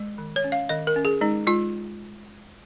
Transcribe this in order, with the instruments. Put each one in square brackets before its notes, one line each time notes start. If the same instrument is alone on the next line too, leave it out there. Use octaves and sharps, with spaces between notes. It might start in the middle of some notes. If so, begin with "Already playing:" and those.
Already playing: [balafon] G#3
D#3
C#5
C#4
F5
D#3 D#5
A#4
C#4
G#4
G#3 D#4
G#3 F4